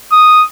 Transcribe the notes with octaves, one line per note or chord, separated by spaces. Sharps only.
D#6